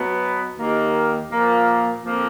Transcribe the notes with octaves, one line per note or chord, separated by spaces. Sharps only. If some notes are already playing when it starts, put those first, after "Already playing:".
Already playing: B2 F#3 B3
D#2 D#3 A#3
A#2 F3 A#3
F2 F3 A#3